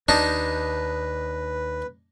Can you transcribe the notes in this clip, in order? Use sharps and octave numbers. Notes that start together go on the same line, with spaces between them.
D#2 D4 D#4 B4